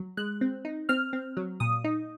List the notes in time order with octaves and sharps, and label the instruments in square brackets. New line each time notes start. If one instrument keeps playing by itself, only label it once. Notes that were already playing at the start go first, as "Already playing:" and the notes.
Already playing: [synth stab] F#3
G#3 F#6
C4
D#4
C4 F6
C4
F#3
A#2 D#6
D#4